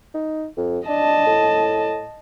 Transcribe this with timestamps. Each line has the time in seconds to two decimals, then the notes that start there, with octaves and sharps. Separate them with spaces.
0.14 D#4
0.57 F2
0.88 D4 D#5 A5
1.27 A2